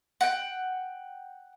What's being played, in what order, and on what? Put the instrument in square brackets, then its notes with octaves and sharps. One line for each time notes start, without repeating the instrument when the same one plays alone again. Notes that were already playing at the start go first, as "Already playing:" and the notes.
[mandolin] F#5 G5